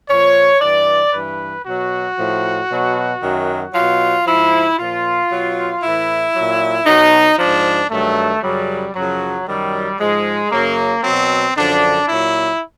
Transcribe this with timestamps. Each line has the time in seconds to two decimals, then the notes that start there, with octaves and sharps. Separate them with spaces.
0.09 A#2 F3 C#5
0.61 G2 E3 D5
1.13 G2 E3 B4
1.65 B2 F#3 F#4
2.17 A2 F3
2.69 B2 F#3
3.21 F#2 D#3 F#3
3.74 B2 F#3 F4
4.26 G#2 F3 E4
4.78 A#2 F3 F4
5.30 B2 F#3
5.82 A2 E3 E4
6.35 A#2 F#3
6.86 B2 F#3 D#4
7.39 G#2 F3 D4
7.91 G2 D#3 F#3 A3
8.43 F#2 C#3 F#3 G3
8.95 F#2 C#3 F3 F#3
9.48 F#2 D#3 F#3 G3
10.00 G#2 F3 G#3
10.51 F#2 C#3 F#3 A#3
11.03 B2 F#3 C4
11.57 F#2 D3 F3 D4
12.08 A#2 F#3 E4